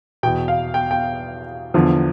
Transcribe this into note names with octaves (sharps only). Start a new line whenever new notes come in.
E2 B2 G5
F5
G5
G5
E2 D3 F3